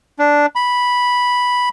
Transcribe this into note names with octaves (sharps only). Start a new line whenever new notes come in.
D4
B5